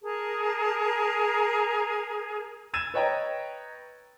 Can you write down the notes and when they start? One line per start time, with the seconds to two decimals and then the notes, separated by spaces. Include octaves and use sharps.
0.03 G#4 A#4 A5 A#5
2.74 E6 G#6 A6 D#7 E7
2.94 B4 C#5 D#5 G5 A#5